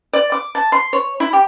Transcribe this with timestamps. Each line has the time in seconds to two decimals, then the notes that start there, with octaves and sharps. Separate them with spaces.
0.13 D5
0.32 D6
0.55 A5
0.72 C6
0.93 C#5
1.20 E4
1.33 G4